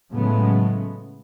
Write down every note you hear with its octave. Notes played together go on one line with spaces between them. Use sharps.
A2 C#3 F#3 G#3 A3 B3